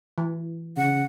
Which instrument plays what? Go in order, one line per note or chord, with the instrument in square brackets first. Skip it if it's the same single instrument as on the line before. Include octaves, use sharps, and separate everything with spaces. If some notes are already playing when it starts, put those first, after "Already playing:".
[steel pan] E3
[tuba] C#3 [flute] F#5